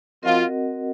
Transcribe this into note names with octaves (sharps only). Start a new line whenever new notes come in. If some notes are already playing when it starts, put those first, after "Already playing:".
F3 C4 F4 F#4 A#4 D#5 F#5